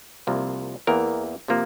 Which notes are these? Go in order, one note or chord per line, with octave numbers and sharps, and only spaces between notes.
C2 C3 F3 A#3
E2 E3 A#3 A#4
C3 F3 A#3